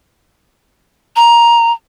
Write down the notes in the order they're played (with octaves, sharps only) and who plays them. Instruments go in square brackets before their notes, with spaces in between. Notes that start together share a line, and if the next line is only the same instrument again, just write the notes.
[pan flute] A#5